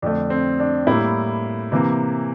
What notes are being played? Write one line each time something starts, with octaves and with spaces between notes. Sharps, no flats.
F2 D3 A3 D4
C4
D4
A2 G3 A#3 E4
C3 E3 A#3